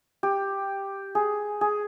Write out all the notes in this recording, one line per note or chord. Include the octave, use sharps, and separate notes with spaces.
G4
G#4
G#4